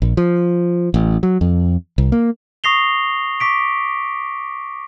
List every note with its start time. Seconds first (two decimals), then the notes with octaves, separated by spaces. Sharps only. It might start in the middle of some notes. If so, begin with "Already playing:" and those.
0.02 A#1
0.17 F3
0.94 A1
1.23 F#3
1.41 F2
1.98 C2
2.12 A#3
2.64 C#6 D#6 A#6 C7 F7 G7
3.40 C#6 D6 B6 D7